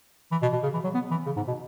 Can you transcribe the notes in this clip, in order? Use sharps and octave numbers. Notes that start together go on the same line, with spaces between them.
E3
B2
B2
C#3
E3
F#3
B3
E3
C#3
G#2
B2